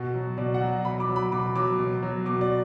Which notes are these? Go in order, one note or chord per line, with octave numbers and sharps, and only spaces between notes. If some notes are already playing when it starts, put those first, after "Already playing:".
Already playing: B2 F#4
F#3
B2 D5
F#5
F#3
B2 B5
D6
F#3
B5
B2 D6
F#3 D6
B2
F#3
B2 D6
D5